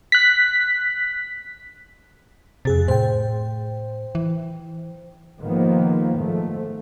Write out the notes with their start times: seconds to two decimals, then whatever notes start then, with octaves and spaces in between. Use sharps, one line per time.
0.12 F#6 B6
2.65 F2 C3 G#4 A6
2.88 A2 C5 G5
4.15 E3
5.41 G#2 D#3 F3 A#3 B3
6.17 G#2 F3 A3